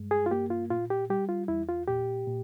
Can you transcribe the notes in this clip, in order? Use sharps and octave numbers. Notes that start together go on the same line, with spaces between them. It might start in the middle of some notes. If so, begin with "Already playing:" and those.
Already playing: G2 G#3
G#4
F4
A#3 G4
F4
A#2 F4
G4
G3 G4
F4
E2 E4
F4
A#2 G4
A#2